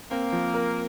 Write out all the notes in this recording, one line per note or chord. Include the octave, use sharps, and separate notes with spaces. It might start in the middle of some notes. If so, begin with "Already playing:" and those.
A#3 C4
F3
A#4